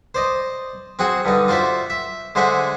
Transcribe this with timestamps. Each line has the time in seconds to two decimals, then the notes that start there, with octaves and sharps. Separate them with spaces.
0.15 C5 D5 D#5
0.99 C4 F#4 G#4 F#5
1.25 G2 D3 D#4
1.48 F4 F#4 C5 D5 E5
1.90 E5
2.35 D3 G#3 C5 E5 F#5 G#5